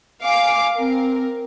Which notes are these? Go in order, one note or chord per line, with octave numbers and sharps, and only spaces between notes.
F5 G#5 D6
C4 A#4